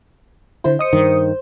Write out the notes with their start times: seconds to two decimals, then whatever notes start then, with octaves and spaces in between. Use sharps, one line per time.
0.64 D3 E4 C5
0.79 D#5 D#6 C#7
0.93 G2 D#3